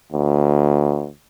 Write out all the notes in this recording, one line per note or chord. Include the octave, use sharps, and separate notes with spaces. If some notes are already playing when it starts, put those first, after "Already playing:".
D2